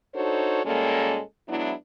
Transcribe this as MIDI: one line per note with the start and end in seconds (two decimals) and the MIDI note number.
0.15 0.63 62
0.15 0.63 63
0.15 0.63 66
0.15 0.63 69
0.15 0.63 72
0.15 0.63 73
0.65 1.21 46
0.65 1.21 55
0.65 1.21 56
0.65 1.21 58
0.65 1.21 61
0.65 1.21 69
1.48 1.73 54
1.48 1.73 56
1.48 1.73 59
1.48 1.73 62
1.48 1.73 64